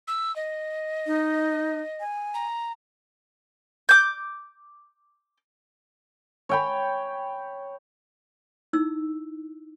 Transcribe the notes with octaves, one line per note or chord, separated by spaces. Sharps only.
E6
D#5
D#4
G#5
A#5
D6 G6
C#5 G5 B5
D#4 E4 E6